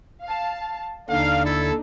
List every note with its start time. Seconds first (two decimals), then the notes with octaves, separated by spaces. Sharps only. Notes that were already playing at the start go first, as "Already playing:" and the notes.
0.24 F5 A5
1.10 D#2 D3 D4 D#4 F5
1.44 E4 A4